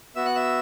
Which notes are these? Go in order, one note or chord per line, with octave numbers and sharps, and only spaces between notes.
B3 F#4 E5 E6
F#5 F#6
E5 E6